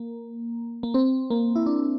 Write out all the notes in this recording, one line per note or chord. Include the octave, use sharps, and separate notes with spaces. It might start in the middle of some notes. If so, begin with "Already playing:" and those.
Already playing: A#3
A#3
C4
A#3
E4
D4